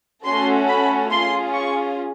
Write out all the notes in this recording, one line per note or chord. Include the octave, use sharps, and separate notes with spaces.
A3 C#4 F#4 A4 C6
B5
C#4 F4 G#4 C6
C#6